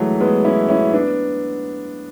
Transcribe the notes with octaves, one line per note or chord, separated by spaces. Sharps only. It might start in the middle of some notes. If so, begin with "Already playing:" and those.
Already playing: E3 F#3 G#3 A3
G#3 B3
C#4 E4
C#4 E4
B3 D4